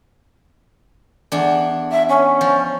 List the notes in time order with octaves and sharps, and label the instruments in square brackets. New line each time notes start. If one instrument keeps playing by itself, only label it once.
[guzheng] E2 D4
[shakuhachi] E5
C#4
[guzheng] F3